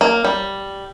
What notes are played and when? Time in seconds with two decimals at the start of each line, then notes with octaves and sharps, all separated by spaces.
0.01 A#3
0.24 G3